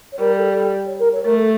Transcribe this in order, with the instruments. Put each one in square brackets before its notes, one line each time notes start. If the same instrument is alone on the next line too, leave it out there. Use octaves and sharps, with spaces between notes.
[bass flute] C#5
[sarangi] G3 [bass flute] A#4
[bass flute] A4
A4
C#5
A#4
C#5
[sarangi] A3 [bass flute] A#4
[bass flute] A4